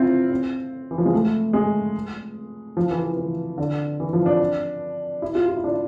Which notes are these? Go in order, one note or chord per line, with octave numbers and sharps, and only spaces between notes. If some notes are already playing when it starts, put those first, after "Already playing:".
Already playing: C4 E4 F4
C4
E3
F3
G#3
A3
G#3
F3
E3
E3
E3
D3
E3
F3
D4
E4
F4
F4
E4
D4
E4